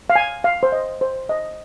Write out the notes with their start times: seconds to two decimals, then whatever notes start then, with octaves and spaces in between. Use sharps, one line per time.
0.10 F5
0.15 G#5
0.44 F5
0.63 C5
0.72 D#5
1.01 C5
1.29 D#5